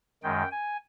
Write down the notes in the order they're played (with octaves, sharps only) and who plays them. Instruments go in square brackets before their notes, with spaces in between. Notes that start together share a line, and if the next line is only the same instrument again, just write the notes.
[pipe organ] F#2 D#3 G#3 G5
G#5